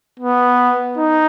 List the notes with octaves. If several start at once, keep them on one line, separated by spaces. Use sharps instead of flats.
B3
D#4